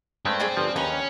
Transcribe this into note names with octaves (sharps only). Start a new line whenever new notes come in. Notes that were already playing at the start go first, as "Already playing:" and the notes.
G2 G#3 A3 C4
G#4 D5 G#5
G1 F3
D#2 C#4 B4 A#5